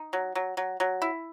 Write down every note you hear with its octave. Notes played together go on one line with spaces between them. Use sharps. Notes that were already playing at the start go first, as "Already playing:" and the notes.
Already playing: D#4
F#3
F#3
F#3
F#3
E4